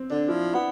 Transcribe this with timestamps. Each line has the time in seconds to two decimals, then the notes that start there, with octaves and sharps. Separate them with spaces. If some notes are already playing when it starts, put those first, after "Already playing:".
Already playing: C4
0.10 D3 D4
0.28 F3 E4
0.54 B3